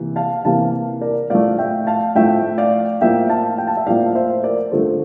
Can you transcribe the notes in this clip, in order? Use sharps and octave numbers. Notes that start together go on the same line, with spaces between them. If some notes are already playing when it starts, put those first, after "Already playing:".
Already playing: C3 E3 A#3
F5 A5
C3 E3 A#3 F5 A5
A#4 D5
A2 F3 A3 D5 F5
E5 G5
F5 A5
A2 F3 A3 E5 G5
D5 F5
A2 F3 A#3 E5 G5
F5 A5
G5
A5
E5 G5
A2 F3 A#3 D5 F5
C5 E5
A#4 D5
D3 F3 A3 A4 C5